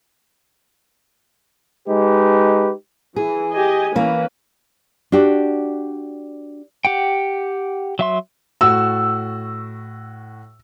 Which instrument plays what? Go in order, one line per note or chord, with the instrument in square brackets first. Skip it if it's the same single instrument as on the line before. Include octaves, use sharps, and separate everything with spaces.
[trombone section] G#3 D#4 G4 B4
[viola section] E3 [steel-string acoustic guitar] G#4
[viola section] G4 D#5 G#5
[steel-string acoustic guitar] E3 A#3 [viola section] C#4 B4
[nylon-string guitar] D4 F#4 G4
[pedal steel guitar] G4 F#5 G5
F#3 E5 C6
[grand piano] A2 F#4 [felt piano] E6